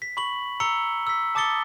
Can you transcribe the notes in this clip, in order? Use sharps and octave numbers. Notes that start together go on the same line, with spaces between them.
B6
B5 C#6 F#7
A#5 E6 C#7 G7
E6 B6
A5 D6 D#6 A6 C#7 G7